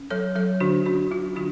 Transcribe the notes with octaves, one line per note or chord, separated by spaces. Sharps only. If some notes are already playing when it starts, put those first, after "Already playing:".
Already playing: C#4
F#3 A4 C#5
F#3 A4 C#5
D3 D4 F#4
C#4 D4 F#4
F#3 F4
D3 D4 F#4